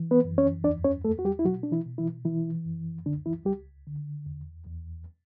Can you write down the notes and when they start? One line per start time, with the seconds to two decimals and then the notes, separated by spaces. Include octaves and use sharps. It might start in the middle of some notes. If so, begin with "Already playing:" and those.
Already playing: E3
0.11 B3 B4
0.25 F#2
0.38 C#4 C#5
0.64 E2 D4 D5
0.84 C#4 C#5
1.04 E2 A3 A4
1.19 F#4
1.25 G3 G4
1.39 E4
1.45 B2 F#3 F#4
1.63 D4
1.72 E3 E4
1.85 B2
1.98 E3 E4
2.25 E3 E4
2.65 F#2
3.05 C#2 D3 D4
3.26 E3 E4
3.45 C#2 G3 G4
3.87 D3
4.26 E2
4.67 E2